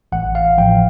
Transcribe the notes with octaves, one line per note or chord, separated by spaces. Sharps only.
A1 F#5
F5
A2 F3 G5